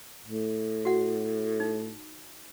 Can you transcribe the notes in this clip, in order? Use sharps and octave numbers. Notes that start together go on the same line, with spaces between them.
A2
F#4 F#5
D#4